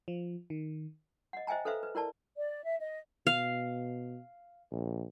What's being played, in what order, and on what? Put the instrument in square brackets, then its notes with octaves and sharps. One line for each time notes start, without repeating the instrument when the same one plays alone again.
[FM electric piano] F3
D#3
[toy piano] D#5 F#5
C5 D#5 E5 G5 G#5 A#5
A4 B4 C5 E5 F5
B4
E4 A#4 D5 A5
[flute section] D5
E5
D#5
[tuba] B2 [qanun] F5
[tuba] A#1